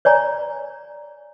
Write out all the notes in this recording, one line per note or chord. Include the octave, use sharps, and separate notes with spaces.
C#5 D5 G#5 A#5